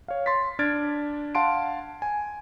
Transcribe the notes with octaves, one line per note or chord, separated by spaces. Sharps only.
C#5 F5
C6 A6 B6
D4 F6 G#6 A6 D7
F5 F#5 A5 C6 D7
G#5